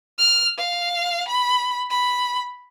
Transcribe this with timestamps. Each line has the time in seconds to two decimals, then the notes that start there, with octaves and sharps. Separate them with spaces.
0.19 F6
0.58 F5
1.28 B5
1.90 B5